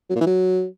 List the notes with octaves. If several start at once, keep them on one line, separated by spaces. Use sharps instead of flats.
F#3
A#2
E3
F#3